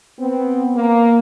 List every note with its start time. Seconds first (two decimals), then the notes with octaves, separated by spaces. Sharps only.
0.19 B3 C4
0.75 A#3